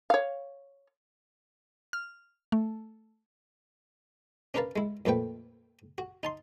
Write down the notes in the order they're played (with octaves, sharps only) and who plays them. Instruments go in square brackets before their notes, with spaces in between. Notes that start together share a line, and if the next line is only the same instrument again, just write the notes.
[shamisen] C#5 F5
[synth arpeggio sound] F6
A3
[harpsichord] C#4 D4 A#4 B4 F5 A5
G#3 E4
F2 A#2 A3 B4 G5
F#4
D#4 A5 C6